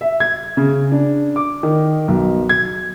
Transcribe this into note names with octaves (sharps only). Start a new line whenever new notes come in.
E5
G#6
C#3
D4
D6
D#3
B1
G#6